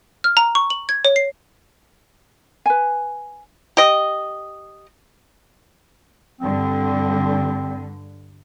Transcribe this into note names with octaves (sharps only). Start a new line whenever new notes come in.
F6
A#5
C#6
F#7
G#6
C#5
C7
B4 G#5
G4 D#5
G2 D3 C4